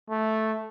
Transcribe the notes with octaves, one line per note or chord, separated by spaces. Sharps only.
A3